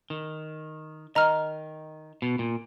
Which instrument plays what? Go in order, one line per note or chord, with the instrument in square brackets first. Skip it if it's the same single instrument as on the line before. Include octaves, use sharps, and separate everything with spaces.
[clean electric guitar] D#3
[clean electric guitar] D#3 [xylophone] D#5 A#5 F6
[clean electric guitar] B2
A#2